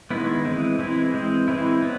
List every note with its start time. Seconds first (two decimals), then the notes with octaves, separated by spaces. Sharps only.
0.11 D#3 G#3 B3 E4
0.45 E3 G#3 C4
0.79 E3 G#3 C4 E4
1.14 E3 G#3 C4
1.48 E3 G#3 C4 E4
1.82 F#3 B3